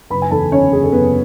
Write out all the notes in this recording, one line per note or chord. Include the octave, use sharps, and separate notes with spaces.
F#1 B4 B5
G#5
E2 A4 A5
D3 C#4 C#5
F#1 G#4
A4
F#1 B3 B4